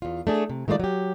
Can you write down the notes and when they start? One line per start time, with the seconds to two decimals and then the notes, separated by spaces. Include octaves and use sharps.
0.02 E2 F4
0.27 A3 D4 G#4
0.49 C3
0.68 D#3 G#3 A3 F4 D5
0.80 F#3 G4